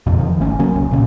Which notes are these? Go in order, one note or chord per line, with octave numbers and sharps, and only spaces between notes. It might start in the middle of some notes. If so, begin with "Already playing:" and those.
E1 A#1 F2 C3
F2 D#3 F3
D1 G#1 A3 C#4
C#3 F#3 A#3 C#4
D#1 C2 C#4
A#2 C#3 C#4